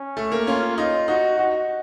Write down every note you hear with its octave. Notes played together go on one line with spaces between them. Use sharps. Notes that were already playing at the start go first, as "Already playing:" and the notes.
Already playing: C#4
A3
A#3
C#4 F4
D#4 F4
D#4 F#4
D#4 F#4